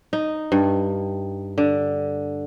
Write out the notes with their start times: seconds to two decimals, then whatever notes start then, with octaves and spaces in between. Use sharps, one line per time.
0.13 D#4
0.52 G2
1.58 D3